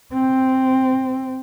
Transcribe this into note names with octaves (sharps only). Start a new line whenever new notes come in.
C4